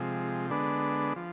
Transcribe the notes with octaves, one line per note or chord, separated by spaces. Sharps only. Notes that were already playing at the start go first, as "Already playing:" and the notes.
Already playing: C3 F3 G#3
D3 G#3 B3 D4
F3